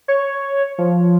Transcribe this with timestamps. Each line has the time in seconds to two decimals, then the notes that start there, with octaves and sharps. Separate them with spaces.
0.08 C#5
0.78 F3